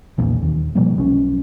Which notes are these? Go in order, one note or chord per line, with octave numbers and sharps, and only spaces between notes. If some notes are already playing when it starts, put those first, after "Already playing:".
B1 E2 A#2
D#2
B2 F3 G3 A#3
B1 C#4